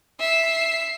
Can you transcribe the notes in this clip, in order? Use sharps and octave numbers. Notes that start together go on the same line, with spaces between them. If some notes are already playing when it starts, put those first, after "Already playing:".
E5 C7